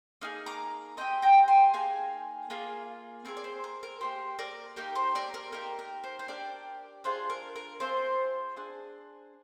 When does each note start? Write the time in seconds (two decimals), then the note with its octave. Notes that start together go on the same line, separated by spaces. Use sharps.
0.21 A#3 D#4 G#4 F6
0.46 A#5 D6
0.97 C4 D#4 G4 D#5 G5
1.22 G5 A#5
1.48 G#5 C6
1.73 A#3 D#4 G#4 F5 G#5
2.50 A#3 F4 G#4
3.25 C4 F4 G#4 A#4
3.37 D5
3.44 C5
3.64 A#4
3.83 A#4
4.00 A#3 D#4 G4 C5
4.39 A#4 D5
4.76 A#3 D#4 G4 A#4
4.95 C5
5.15 A#4 D5
5.34 A#4 D5
5.52 A#3 D#4 G4 A#4
5.79 A#4
6.04 C5
6.19 C5
6.28 D4 G4 A#4 D5
7.04 D4 F4 G#4 C5
7.30 A#4
7.56 A#4
7.80 C4 F4 G#4 C5
8.56 D4 G#4